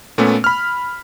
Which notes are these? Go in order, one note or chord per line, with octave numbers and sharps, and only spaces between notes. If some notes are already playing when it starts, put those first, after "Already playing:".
A#2 A3 B3 C#4
B5 F6